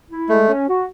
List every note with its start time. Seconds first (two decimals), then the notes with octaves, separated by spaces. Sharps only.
0.10 E4
0.29 G#3 A3
0.48 C#4
0.67 F#4